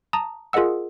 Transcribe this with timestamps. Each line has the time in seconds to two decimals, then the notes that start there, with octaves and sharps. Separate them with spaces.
0.13 A5 A#5 D#6
0.53 F4 G#4 A#4 D#5 F#5 E6